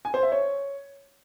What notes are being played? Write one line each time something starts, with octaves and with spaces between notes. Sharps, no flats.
G#5
C5
E5
C#5